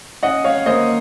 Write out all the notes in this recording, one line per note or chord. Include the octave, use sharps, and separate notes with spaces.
C#4 D#5 F#5
C#5 F5
A#3 C5 D#5